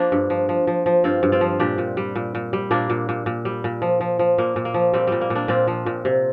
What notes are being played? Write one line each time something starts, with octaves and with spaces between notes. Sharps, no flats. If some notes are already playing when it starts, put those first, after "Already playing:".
Already playing: F3 A#3 D4
G2
F3
F3
F3
F3
G2 C4 F4
G2
C4 F4
F3
A#2 D4 G4
A#2
G3
A#2
A#2
G3
A#2 A#3 D4
A#2
A#2
A#2
G3
A#2
F3
F3
F3
A#2 A#3
A#2
A#3
F3
A#2 G3 C4
A#2 G3
A#3
A#2
A#3 D4
A#2 C4 F4
F3
A#2
C3